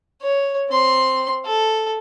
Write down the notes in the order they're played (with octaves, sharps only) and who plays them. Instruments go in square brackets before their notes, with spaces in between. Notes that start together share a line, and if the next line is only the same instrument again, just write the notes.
[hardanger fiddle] C#5
C4 C6
A4